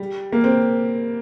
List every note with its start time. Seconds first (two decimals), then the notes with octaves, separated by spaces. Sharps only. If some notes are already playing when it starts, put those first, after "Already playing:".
Already playing: G3
0.32 A#3
0.44 C4